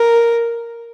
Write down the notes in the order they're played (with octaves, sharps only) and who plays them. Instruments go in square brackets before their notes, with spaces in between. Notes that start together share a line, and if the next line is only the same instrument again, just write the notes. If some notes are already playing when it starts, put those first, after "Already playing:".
Already playing: [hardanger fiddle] A#4